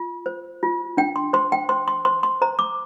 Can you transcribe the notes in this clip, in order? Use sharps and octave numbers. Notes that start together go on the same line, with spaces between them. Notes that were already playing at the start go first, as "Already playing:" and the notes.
Already playing: F4
C5
F4
D4 G5
C6
C5 C6
G5
C5 C6
C6
C5 C6
C6
C5 A#5
D6